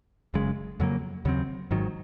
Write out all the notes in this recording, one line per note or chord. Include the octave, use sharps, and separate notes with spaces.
F#1 F#2 C#3 G#3
F2 C#3 F#3 A#3
D#2 C#3 F#3 C4
G#1 G#2 D#3 F#3